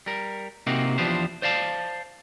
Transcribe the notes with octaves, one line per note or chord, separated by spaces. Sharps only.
G3 A#4
C3 A#3 C4 D#4 F#4
E2 F3 B3 D4 G4 C5
C5 D5 F5 A5